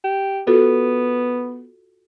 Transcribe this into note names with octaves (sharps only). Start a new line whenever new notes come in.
G4
B3 F4 F#4 A4